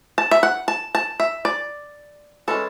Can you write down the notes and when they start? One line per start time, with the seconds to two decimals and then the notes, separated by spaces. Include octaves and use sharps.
0.18 A5
0.31 E5
0.43 F#5
0.68 A5
0.95 A5
1.20 E5
1.45 D5
2.48 E3 G#3 C#4 A4